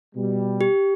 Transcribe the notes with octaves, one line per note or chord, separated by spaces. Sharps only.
B2 G3
G4